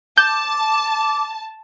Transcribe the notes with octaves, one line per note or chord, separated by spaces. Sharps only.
A5 D6 G6